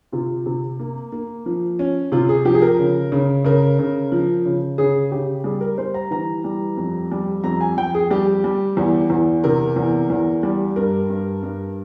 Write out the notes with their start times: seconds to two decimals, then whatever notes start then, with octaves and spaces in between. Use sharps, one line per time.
0.12 C3 F4
0.46 C3
0.79 A#3
1.12 A#3
1.46 F3
1.79 C#4
2.12 C3 F4
2.29 G#4
2.45 F3 G4
2.54 G#4
2.62 A#4
2.79 C#3
3.12 C#3
3.45 C#3 A#4
3.79 C#3
4.12 F3
4.46 C#3
4.78 C#3 G#4
5.12 C#3 G4
5.44 G3 G#4
5.61 A#4
5.78 G3 C5
5.94 A#5
6.11 E3 A#5
6.44 G3
6.77 F2
7.12 G3
7.44 F2 A#5
7.61 G#5
7.77 F2 G5
7.95 G#4
8.11 G3 G4
8.44 G3
8.77 E2
9.10 E2
9.44 C3 A#4
9.76 E2
10.10 E2
10.43 G3
10.76 G2 A#4
11.10 G2
11.43 G2